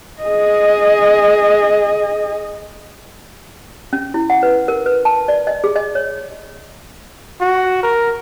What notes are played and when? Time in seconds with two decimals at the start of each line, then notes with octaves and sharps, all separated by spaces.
0.22 G#4 D#5
3.93 C#4
4.14 E4
4.30 F#5
4.43 B4
4.68 A#4
4.86 B4
5.05 A5
5.28 D5
5.47 D#5
5.64 G#4
5.76 D#5
5.95 C#5
7.41 F#4
7.83 A#4